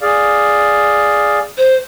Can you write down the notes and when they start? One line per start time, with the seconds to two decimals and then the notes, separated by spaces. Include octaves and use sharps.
0.01 G#4 D5 F5
1.58 C5